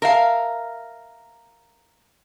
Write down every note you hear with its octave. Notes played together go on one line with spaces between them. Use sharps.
A#4 E5 F5